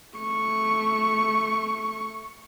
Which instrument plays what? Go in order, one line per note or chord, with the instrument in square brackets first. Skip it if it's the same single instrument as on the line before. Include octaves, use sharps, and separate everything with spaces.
[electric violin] A3 C#6